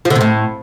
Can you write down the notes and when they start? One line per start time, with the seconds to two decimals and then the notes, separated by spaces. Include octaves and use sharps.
0.05 F3
0.10 D3
0.16 C3
0.21 A2